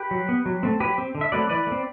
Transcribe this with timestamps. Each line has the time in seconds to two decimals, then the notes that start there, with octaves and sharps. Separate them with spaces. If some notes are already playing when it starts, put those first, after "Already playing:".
Already playing: G4 B4
0.11 F#3
0.29 B3
0.46 F#3
0.63 A3 C4
0.80 F#3 G4 B4
0.98 C4
1.15 D3
1.21 E5
1.32 F#3 A3 C4 B4 D5
1.49 E3 B4 D5
1.67 A3
1.72 C4